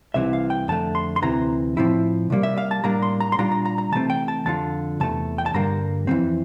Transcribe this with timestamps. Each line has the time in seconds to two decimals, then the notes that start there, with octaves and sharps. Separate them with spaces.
0.14 C2 C3 E3 E5
0.33 F5
0.50 G5
0.68 F2 D3 A3 A5
0.95 C6
1.16 C6
1.22 D2 C3 E3 A#5
1.77 A2 F3 C4 E4
2.30 C3 G3 A#3
2.43 E5
2.58 F5
2.71 A5
2.84 A2 G3 A#3 D4 A#5
3.02 C6
3.20 A#5
3.32 C6
3.38 A#2 G3 D4 F4 A#5
3.52 A#5
3.66 A#5
3.78 A#5
3.92 C3 E3 A3 C4 A5
4.10 G5
4.28 A5
4.46 F2 D3 F3 F4 A5
5.00 E2 C3 A3 A5
5.38 G5
5.46 A5
5.54 G2 D3 G3 A#3 A#5
6.07 F2 E3 G3 C4